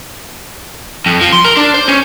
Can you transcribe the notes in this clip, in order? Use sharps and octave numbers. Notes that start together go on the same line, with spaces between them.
F2
F3
C6
A#4
D4
C5
C#4